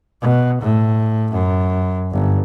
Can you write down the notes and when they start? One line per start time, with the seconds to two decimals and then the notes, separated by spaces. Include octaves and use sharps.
0.21 B2
0.61 A2
1.32 F#2
2.12 G1